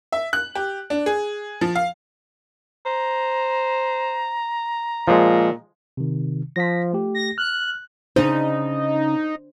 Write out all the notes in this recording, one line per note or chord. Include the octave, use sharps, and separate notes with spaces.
E5
F#6
G4
D4
G#4
F3
F5
C5 A#5
A#2 F3 G#3
C3 D#3
F3 A#6 B6
A3 G4
A#6
F6 F#6
C#3 D4 D#4 C5